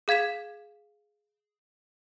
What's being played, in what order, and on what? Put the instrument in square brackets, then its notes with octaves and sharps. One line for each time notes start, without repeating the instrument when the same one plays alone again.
[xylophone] G#4 F5 G#6 B6 E7